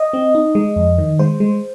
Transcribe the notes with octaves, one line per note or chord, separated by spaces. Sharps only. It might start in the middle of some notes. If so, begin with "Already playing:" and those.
Already playing: D#5
C4
D#4
G#3
F2
D#3
G#3 C5
G#3